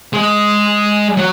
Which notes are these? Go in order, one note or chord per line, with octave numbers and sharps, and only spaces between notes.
G#3
F#3